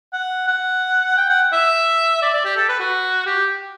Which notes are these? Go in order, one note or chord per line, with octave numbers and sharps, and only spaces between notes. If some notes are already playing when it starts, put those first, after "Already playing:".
F#5
F#5
G5
F#5
E5
D5
D5
G4
A4
B4
F#4
G4